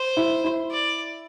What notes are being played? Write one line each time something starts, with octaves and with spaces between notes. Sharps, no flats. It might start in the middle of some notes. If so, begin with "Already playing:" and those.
Already playing: C5
E4
E4
D5